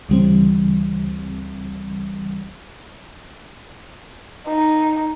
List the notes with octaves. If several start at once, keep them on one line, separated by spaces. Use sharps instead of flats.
D2 C#3 E3 G3 C4
D#4